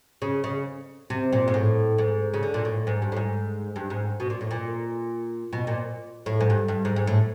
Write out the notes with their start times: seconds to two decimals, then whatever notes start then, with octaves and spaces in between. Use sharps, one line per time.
0.22 C#3
0.44 C#3
1.10 C3
1.32 A#2
1.48 G#2
1.54 A2
1.98 G#2
2.34 C#3
2.43 D3
2.54 A#2
2.65 A2
2.87 G#2
3.02 G2
3.12 A2
3.16 G#2
3.76 G2
3.90 G#2
4.20 B2
4.30 A#2
4.41 A2
4.51 A#2
5.53 B2
5.67 A#2
6.26 A2
6.41 G#2
6.50 G2
6.68 G2
6.85 G#2
6.96 G#2
7.07 A2